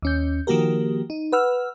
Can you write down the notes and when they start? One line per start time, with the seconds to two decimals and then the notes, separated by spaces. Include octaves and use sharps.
0.02 D#2 C#4 G6
0.47 D#3 F3 A#3 F#4 G4 A#4
1.10 D#4
1.32 B4 F#5 E6 F6